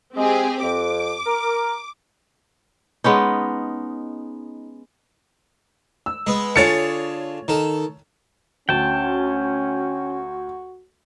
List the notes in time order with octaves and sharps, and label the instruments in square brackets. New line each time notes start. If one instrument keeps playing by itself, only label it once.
[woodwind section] G#3 [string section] C4 G4 G#4
[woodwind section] F2 [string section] D6
[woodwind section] A#4
[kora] G#3 B3 C#4 D#4
[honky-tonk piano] E6
[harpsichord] G#3 B3
[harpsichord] D3 F4 G#4 [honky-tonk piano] C#5 A6 C#7
[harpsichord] D#3 A4
[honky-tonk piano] D2 [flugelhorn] C#4 [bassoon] F#4 [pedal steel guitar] G5 A5